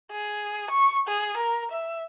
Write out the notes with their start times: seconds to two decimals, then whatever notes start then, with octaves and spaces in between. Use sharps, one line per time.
0.11 G#4
0.71 C#6
1.08 G#4
1.37 A#4
1.71 E5